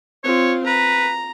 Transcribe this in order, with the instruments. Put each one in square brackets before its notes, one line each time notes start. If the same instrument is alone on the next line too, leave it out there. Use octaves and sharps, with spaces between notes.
[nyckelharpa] C4 F4 [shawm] C#5
[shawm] B4 [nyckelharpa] A#5